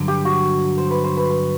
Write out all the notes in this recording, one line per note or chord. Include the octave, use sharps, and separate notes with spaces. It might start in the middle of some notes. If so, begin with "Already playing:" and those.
Already playing: G2 D3 F#3
G4
F#4
C5
B4
C5
B4
B4